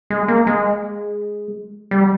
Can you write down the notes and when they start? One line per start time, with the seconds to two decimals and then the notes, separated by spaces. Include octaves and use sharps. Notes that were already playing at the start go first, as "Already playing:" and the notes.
0.10 G#3
0.28 A#3
0.47 G#3
1.91 G3